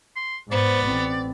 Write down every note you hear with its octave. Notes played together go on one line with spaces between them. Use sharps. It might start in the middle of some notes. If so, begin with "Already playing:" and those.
C6
G#2 B2 B3 C5 D5
A1 C4